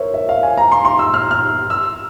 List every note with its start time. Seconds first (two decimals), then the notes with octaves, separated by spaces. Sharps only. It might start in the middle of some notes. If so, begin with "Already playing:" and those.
Already playing: A#4 C5 C#5 E5
0.14 E5
0.29 F5
0.43 G#5
0.57 A#5
0.72 C6
0.85 C6
0.99 E6
1.14 F6
1.31 F6
1.70 E6